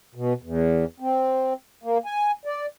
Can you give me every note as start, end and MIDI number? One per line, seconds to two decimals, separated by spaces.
0.15 0.33 47
0.42 0.85 40
1.00 1.53 60
1.84 1.98 58
2.06 2.31 80
2.46 2.66 74